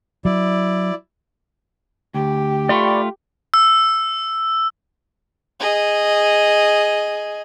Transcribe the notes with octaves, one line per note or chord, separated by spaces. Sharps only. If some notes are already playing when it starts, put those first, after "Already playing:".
F#3 E4 D5
D2 G4
A3 F4 D5 B5 C#6
E6
G#4 D#5